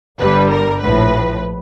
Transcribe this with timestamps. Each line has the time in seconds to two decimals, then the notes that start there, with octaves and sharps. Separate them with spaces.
0.19 G1 G2 D3 G3 B4
0.51 A#4
0.81 A#1 A2 F3 B4